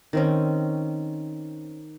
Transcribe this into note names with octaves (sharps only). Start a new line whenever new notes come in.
D#3 C4 C#4